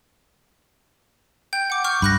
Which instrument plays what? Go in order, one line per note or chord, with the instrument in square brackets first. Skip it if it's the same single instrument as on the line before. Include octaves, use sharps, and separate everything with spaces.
[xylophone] G5 G6
F#5 D6
C#6 F6 G6
[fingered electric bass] G2 [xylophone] B5 F#6 A#6